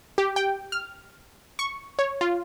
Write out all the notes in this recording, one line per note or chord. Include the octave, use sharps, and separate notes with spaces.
G4
G5
F6
C#6
C#5
F4